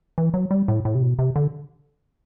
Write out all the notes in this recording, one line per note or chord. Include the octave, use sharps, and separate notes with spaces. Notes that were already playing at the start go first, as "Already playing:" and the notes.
E3
F#3
G3
A2
A2
C3
B2
C3
D3